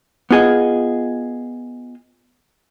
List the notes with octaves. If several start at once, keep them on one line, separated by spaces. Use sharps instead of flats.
B3 F4 G#4 D#5